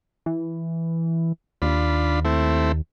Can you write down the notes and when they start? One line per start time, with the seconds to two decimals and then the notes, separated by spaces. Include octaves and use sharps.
0.26 E3
1.62 D#2 D4 F4 B5
2.25 A3 C4 E4